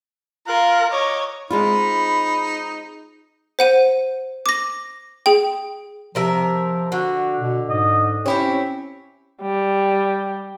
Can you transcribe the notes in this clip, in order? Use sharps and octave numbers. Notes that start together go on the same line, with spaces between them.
F4 A#4 F5 F#6
C#5 D#5 A#5 D6
G#3 C4 D#4 F4 B5
C5 F#5 D#7
D6 A#6
G#4 G5
C3 F3 A#4 E5
D3 F#4
B2
G#2 D#5
C4 C#4 E4 G4 C#5
G3